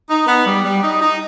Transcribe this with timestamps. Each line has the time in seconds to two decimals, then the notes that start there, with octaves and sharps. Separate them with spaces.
0.09 D#4
0.26 B3
0.46 G3
0.64 G3
0.83 D#4
1.01 D#4